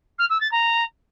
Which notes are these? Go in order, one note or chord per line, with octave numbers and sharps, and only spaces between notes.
F6
E6
A6
A#5